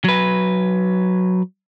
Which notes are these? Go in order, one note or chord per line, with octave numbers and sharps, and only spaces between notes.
F#3 B4